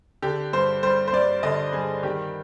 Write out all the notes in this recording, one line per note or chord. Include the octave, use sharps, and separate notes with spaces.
D3 G4
G2 C5
G3 C5
C5
G2 D5
D3 D#5
G2 G#4
D#3 G4